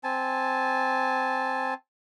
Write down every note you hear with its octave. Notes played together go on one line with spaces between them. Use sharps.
C4 G#5 A5